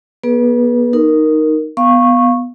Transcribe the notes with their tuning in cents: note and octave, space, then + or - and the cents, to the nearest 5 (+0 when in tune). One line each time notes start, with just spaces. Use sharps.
B3 -40 G#4 +30 B4 -20
D#4 -5 A#4 +0
B3 +0 F5 +0 C#6 -15